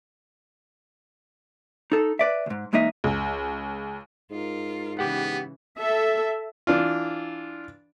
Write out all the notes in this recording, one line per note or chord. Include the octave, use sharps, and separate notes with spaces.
D#4 A4
B4 D5 E5
D2 G#2
E2 G#3 A#3 D#4 D#5 E5
C#2
G#2 F4 A#4
C#3 E3 B3 G4 F#5
A4 E5
E3 D4 F4